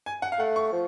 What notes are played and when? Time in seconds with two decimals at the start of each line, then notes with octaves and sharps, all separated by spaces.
0.06 G#5
0.22 F#5
0.32 F5
0.39 A3 F#5
0.56 C#6
0.72 F3